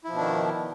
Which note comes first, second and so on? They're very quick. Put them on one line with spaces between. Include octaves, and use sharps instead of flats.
E4 F3 B2 D4 D#3